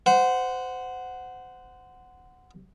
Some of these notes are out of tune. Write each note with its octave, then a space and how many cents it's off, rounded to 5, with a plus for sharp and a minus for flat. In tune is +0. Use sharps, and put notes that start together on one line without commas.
C5 -25 F#5 +0